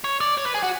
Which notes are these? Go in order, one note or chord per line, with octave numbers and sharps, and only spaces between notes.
C#5
D5
C#5
B4
G#4
F#4